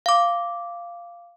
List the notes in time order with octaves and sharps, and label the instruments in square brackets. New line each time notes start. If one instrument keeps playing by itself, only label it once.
[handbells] F5 D6